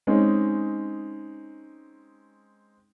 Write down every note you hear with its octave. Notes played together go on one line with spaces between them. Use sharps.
G#3 C4 C#4 D#4